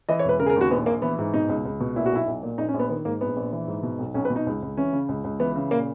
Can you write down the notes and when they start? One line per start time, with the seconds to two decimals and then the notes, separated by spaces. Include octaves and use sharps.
0.09 E3 D#5
0.19 C#5
0.24 E1 B4
0.40 C#3 A#4
0.46 G#4
0.50 A#4
0.56 D#2 F#4
0.71 A#1 B3
0.86 A#1 A#3
1.02 E3 B3
1.19 G#2
1.34 B2 D#4
1.49 C#2
1.65 C#2
1.80 B2
1.96 A#2 E4
2.06 F#4
2.12 B1 E4
2.27 B1
2.43 A#2
2.58 A#1 D#4
2.68 C#4
2.74 A#1
2.79 B3
2.89 D#3 B3
3.05 G#2 A#3
3.21 A#1 B3
3.36 A#1
3.53 E3
3.68 G#2
3.83 B2
3.99 B1
4.14 B1 C#4
4.25 B4
4.30 B2
4.36 D#4
4.47 C#2
4.62 C#2
4.77 E3 C#4
4.93 C#3
5.09 C#2
5.24 C#2
5.40 E3 B3
5.55 C#3
5.71 A#2 A#3